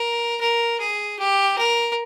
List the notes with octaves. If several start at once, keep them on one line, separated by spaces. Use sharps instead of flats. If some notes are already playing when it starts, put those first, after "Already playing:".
Already playing: A#4
A#4
G#4
G4
A#4